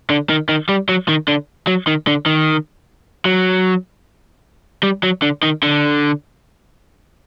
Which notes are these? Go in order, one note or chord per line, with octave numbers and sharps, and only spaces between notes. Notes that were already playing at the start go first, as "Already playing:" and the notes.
D3
D#3
D#3
G3
F#3
D#3
D3
F#3
D#3
D3
D#3
F#3
G3
F#3
D3
D#3
D3